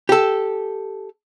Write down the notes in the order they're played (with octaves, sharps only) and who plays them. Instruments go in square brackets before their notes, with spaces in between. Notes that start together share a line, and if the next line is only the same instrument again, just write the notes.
[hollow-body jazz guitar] G4 A4